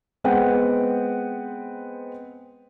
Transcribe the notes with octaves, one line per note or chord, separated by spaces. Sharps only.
G#3 B3 C4 B4 F#5 G5